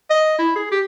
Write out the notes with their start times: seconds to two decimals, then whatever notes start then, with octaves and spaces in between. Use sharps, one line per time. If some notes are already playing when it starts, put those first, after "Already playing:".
0.10 D#5
0.39 E4
0.56 G#4
0.71 G4